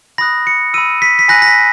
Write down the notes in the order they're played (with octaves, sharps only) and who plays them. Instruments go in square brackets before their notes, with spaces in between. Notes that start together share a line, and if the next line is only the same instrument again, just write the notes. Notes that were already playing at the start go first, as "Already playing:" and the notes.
[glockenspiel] B5 D#6 F#6 A#6
C#7
B5 E6 D#7
B6
B6
G#5 B5 F#6 A#6
A#6
B6